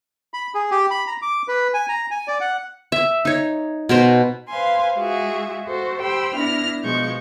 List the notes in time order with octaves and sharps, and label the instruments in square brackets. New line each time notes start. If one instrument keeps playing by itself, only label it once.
[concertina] B5
G#4
G4
B5
A#5
D6
B4
G#5
A#5
G#5
D5
F#5
[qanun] E5
D#4 C#5
B2 A#4 C5
[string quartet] B4 C5 F5 G#5 C6
G#3 F4 F#4 G#4 E5
F#4 A4 C5
G4 C5 G5 B5 C6 E6
B3 D4 E4 F6 A#6
B2 F3 G#3 C#6 G6